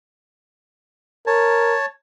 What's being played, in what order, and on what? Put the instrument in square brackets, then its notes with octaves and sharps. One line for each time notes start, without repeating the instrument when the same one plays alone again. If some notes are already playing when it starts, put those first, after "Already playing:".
[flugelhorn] A#4 [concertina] C#5 A5